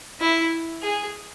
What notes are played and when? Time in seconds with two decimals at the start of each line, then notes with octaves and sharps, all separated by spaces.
0.21 E4
0.83 G#4